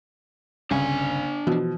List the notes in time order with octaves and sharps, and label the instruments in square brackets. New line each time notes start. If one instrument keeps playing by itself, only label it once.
[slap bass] G1 C2 [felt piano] C#3 [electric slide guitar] D4 G#5
[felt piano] B2 [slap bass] E3 F3